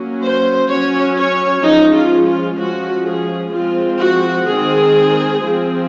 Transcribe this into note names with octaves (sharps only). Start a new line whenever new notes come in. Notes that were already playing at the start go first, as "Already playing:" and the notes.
Already playing: F#3 A#3 C#4
C5
F#3 C#4 C#5
C#5
F3 G#3 C#4 D#4
F4
F4
F3 G#3 C#4 F#4
G#4
F3 G#3 C4 F4
F#4
D#3 G#3 C4 G#4
F3 C4